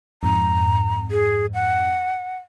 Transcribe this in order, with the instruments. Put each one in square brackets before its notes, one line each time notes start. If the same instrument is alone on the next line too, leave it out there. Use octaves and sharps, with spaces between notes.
[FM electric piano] F2 G#2 [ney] A#5
[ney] G#4
F#5